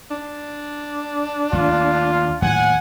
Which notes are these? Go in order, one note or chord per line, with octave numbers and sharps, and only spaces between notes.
D4
D#2 A3 F4
D#2 A2 F#3 F#5 G#5